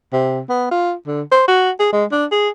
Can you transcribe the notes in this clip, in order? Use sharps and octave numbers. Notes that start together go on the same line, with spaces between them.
C3
B3
F4
D3
C5
F#4
G#4
G#3
D4
G#4